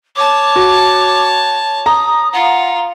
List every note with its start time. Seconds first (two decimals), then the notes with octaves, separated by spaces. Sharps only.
0.16 C#5 A5 D6
0.56 F#4
1.86 A#5 D#6
2.33 F4 F#5